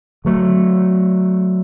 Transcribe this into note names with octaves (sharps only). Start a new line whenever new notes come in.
D3 F#3 A3